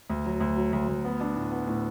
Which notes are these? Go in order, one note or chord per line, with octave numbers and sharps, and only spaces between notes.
D2
F#3
D2
F#3
D2
D2
B3
D4
A2
B3
A2